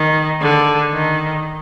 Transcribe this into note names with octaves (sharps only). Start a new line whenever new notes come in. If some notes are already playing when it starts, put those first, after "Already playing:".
Already playing: D#3
D3
D#3